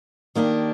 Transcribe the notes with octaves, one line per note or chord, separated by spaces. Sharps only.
D#3 A#3 D4 G4